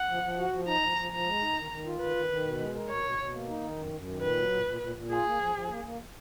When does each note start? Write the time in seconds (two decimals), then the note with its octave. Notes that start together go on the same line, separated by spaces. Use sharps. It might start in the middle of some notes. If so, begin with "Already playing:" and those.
Already playing: F#5
0.09 F3
0.23 F3
0.38 F#4
0.53 F3
0.67 D#4 A#5
0.82 F3
0.97 F3
1.12 F3 A#5
1.27 G#3
1.41 D#4
1.56 D#3
1.70 D#3
1.85 F4
2.00 D#3 B4
2.15 D#3
2.30 D#3
2.45 B2
2.59 G#3
2.75 A#4
2.89 B2 C#5
3.04 B2
3.19 B2
3.33 A#3
3.48 D#4
3.63 D#3
3.78 F#2
3.93 F#2
4.07 D#3
4.21 A#2 B4
4.37 F#3
4.51 A#2
4.66 A#2
4.81 A#2
4.96 A#2
5.10 F4 G#4
5.25 A#3
5.40 F3
5.55 F3
5.69 A#3
5.84 A#3